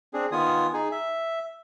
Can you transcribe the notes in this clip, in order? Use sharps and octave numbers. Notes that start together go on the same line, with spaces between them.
C4 D4 G#4
D#3 B3 F4 G#5 D#6
D#4 G#4 G#5
E5